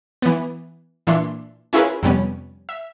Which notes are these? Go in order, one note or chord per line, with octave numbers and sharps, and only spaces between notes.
E3 B3
A#2 E3 D4 E5 C6
C#4 E4 F4 G#4 A#4 B4
F2 C3 G3 B3 C#4
E5